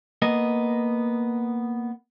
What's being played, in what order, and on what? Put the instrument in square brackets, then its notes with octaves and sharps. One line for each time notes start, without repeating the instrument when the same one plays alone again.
[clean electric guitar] A#3 B3 D#5